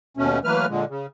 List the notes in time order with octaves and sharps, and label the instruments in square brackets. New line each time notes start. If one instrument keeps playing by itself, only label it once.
[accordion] D#2 B2 A3 C#4
E3 F#3 A3 A#3 B4 F6
A#2 D3 G#3
C#3